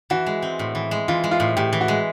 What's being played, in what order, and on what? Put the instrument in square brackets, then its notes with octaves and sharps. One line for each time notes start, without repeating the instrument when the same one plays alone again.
[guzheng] E3 [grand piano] F#4
[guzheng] G#3
C4
A2
E3
G#3
[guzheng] E3 [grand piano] F4
[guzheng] G#3
[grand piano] F4
[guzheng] A2
[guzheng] A2 [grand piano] G4
[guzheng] E3
[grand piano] F#4
[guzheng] G#3